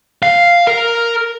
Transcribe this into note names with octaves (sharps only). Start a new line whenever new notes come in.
F5
A#4